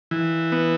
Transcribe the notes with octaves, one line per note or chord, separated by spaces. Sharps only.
E3
B3